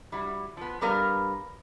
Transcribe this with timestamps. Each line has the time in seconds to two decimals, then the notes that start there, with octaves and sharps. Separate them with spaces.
0.12 G3 E4 F#4
0.57 F3 B3
0.81 G2 G3 B3 A#4 F5